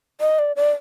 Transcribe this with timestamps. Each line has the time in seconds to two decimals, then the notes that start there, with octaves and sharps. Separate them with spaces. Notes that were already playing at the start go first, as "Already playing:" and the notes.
0.21 D#5
0.39 D5
0.56 D5